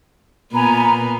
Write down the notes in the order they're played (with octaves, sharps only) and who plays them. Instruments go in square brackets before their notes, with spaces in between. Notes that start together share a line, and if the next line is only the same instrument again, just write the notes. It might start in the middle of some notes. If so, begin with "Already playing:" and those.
[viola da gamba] A#2 B3 [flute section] G#5 A#5 B5